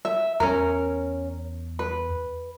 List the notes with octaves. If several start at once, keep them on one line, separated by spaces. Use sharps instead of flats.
E5
E2 C#4 A#4
B4